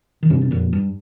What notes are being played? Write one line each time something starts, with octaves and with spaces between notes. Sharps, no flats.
D#3
G2 C3
C3
F2 A#2
G2